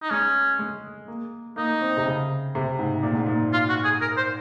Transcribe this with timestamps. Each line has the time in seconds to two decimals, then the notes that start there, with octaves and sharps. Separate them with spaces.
0.02 D#4
0.10 G#3 C#4
0.59 G#3
1.08 A#3
1.56 A#3 D#4
1.81 C4
1.97 C3
2.05 C#3
2.55 C3
2.79 G#2
3.03 A#2
3.15 G#2
3.26 A#2
3.53 F4
3.69 F#4
3.84 G#4
4.01 A#4
4.17 C5